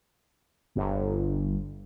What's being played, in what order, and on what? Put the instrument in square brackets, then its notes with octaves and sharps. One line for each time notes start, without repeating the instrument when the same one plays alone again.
[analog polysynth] G1